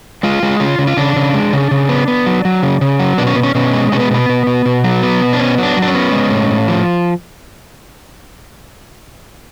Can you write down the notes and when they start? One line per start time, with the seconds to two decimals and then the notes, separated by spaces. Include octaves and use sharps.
0.23 G#3 F4
0.43 G#3
0.60 C#3 F4
0.79 C#3
0.87 F4
0.97 C#3 D4
1.16 C#3
1.34 G#3
1.53 C#3
1.71 C#3
1.89 B3
2.08 B3
2.26 F#3
2.45 F#3
2.63 C#3
2.81 C#3
2.99 F#3
3.18 B2 D4
3.27 C#4
3.35 B2 B3
3.43 C#4
3.55 B2 C#4
3.73 G#3
3.92 B2 C#4
4.00 B3
4.11 B2 B3
4.29 B2
4.47 B2
4.65 B2
4.84 F#3
5.03 B3
5.21 B2
5.33 D4
5.39 B3 C#4
5.58 F#3
5.63 D4
5.77 F#3
5.82 D4
5.88 C#4
5.95 B3
6.13 G#3
6.31 A2
6.50 A2
6.68 F3